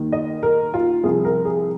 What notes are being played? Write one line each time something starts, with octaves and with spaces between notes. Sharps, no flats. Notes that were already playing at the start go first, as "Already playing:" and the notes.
Already playing: D#2 D#3
D#5
A#4
F4
C2 C3 F3 G#4
A#4
G#4